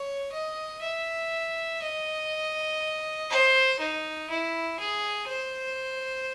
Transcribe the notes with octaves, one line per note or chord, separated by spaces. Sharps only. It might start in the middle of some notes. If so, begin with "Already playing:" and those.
Already playing: C#5
D#5
E5
D#5
C5
D#4
E4
G#4
C5